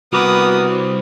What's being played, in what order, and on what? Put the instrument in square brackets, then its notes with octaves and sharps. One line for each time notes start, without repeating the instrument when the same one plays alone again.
[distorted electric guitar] C2 [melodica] B3 A#4 [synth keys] F#4 D6 [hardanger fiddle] B4 D#6
[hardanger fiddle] C4